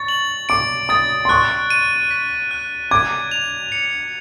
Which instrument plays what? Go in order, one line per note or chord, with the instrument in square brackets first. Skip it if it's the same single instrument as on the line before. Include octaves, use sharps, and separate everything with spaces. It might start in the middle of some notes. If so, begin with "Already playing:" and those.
Already playing: [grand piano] C#6 [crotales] A6
[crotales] F#7
[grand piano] D6 [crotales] D7
[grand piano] D#6 [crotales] A6
[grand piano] C6
[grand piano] C#6 [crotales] F#6
[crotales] D#7
B6
F#6
[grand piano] D6 [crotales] G#6
[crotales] F7
C#7